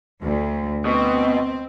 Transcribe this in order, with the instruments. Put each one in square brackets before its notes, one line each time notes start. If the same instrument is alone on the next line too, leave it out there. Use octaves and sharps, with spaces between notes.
[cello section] D2
[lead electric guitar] B2 [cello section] C4